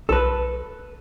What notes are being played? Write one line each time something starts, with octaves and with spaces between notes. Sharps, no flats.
B1 A4 B4